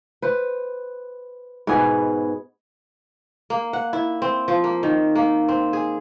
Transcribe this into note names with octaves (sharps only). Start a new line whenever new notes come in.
B4 C5
G#2 B2 B3 G#4
A#3
F#5
E4
C4
F3
A#3
D#3
A#3
C4
G#4